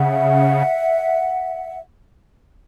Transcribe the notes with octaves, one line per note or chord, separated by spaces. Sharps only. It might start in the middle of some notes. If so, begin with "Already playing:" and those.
Already playing: C#3 E5 F#5